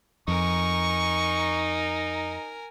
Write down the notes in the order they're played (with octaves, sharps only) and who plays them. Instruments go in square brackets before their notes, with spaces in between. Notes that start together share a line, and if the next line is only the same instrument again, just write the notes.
[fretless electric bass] F2 [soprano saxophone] D#4 [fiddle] A#4 G#5 [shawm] C#6